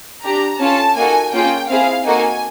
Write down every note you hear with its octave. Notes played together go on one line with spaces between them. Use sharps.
D4 G4 A#5
C#4 F4 A4 A5
A#3 D#4 F#4 A4 G#5
A#3 C#4 F4 G#4 G5
C4 E4 G#4 F5
A#3 D#4 F#4 A4 G#5